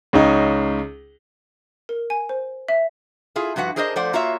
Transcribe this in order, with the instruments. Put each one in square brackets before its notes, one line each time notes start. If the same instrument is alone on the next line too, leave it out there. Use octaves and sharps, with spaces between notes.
[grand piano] C#2 C#4 D#4
[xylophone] A#4
G#5
C5
E5
[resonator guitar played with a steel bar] E4 F4 G#4
G2 F3 F#4 B4 F#5
D4 G#4 A#4 C5 D5 D#5
F3 A3 C5 D5 F#5
A#3 F4 F#4 C#5 E5